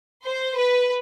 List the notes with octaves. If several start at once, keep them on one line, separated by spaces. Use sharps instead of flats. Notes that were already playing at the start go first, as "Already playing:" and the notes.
C5
B4